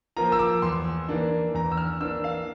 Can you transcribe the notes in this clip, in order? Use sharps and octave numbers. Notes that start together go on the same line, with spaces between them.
F3 A#3 F4 A#5
E6
D6
E2 C6
E3 A#3 D4
E2 A#5
E6
F6
E3 A#3 D4 E6
F5